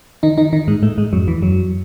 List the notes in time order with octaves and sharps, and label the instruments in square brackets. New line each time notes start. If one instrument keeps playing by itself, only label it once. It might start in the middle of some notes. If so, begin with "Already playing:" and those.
[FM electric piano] D#3 D#4
D#3 D#4
D#3 D#4
G#2 G#3
A2 A3
G#2 G#3
F#2 F#3
E2 E3
F#2 F#3